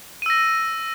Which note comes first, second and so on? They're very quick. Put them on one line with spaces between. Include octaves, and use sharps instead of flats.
D#7 E6 A#6